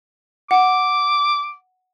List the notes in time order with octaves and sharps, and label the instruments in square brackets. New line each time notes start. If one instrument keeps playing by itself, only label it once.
[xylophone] F#5 [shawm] D6